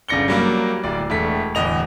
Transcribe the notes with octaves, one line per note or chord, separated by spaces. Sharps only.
G1 C#3 D5 A#6 C#7 G7
F#3 G3 A#3
D1 D5
E1 A3 B6
D1 E2 D#5 F7